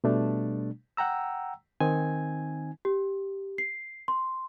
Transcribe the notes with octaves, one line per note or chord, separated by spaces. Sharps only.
B2 G3 A3 D4
F#5 G5 A#5 E6
D#3 C4 D#4 G#5 G#6
G4
C7
C6